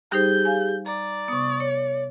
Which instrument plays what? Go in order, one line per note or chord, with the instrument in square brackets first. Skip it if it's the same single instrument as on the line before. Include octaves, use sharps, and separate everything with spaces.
[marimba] G3 D#4 C5 [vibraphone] G4 G#4 [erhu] G6
[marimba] F5 G#5
[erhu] D5 [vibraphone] A#5
[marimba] C3 B3 [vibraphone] C#6 D#6
[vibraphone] C#5